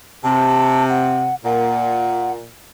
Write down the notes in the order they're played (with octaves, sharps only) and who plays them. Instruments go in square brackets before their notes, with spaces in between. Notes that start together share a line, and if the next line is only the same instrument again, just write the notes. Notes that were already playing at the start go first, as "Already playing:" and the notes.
[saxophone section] C3 [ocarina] A5
[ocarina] F#5
[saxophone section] A#2 [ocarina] F#5